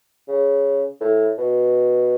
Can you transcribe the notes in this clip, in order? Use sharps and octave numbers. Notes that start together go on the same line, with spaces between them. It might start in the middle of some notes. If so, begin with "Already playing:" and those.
C#3
A2
B2